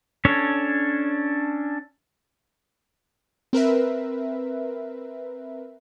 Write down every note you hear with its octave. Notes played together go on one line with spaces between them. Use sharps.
C#4 D4 A4 C#5
C4 A#4 B4 E5